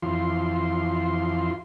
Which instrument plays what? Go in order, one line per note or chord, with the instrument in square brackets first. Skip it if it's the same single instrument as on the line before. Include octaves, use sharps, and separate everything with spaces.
[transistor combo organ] F2 E3 F4 C6